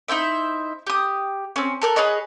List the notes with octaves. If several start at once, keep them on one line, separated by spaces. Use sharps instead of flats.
D#4 E4 C5 E5
G4 D#6
C4 C#4
A4 A#4 F#6
G#4 B4 C#5 D#5